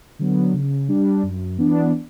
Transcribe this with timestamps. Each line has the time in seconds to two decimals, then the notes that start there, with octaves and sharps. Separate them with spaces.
0.19 D3 F#3 B3
0.54 C#3
0.88 G3 D4
1.23 F#2
1.58 E3 B3 D4